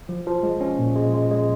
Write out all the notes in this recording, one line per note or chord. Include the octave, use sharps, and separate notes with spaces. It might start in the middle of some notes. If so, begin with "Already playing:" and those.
F3
F3
G#3
C#4
A#2
G#3
G#3
G#3